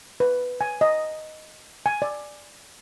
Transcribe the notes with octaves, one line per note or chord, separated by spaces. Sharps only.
B4
G#5
D#5
G#5
D5